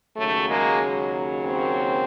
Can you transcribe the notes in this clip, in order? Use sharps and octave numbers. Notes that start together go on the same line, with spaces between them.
D#2 C#3 F#3 A3
G#3 A#3
A#3 C4